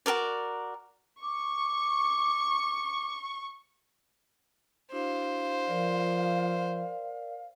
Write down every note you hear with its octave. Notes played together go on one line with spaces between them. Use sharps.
F#4 A4 A#4 D5
C#6 D6
D4 E4 F#4 C5 F5
F3 A#4 D5